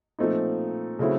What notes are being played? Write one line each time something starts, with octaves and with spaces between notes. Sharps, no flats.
A#2 F3 A3 C4 D#4
C#3 F#3 A3 C4 E4